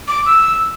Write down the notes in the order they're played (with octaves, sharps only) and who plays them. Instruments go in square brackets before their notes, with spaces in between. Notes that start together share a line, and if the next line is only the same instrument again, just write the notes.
[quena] D6
E6